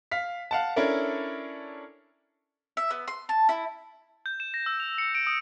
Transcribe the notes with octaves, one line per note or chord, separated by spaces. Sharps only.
F5 B6
F5 F#5 A5
C#4 D4 E4 A4 A#4
E5
B3
C6
A5
E4
G6
E7
A#6
E6
F7
C#7
D7
D#6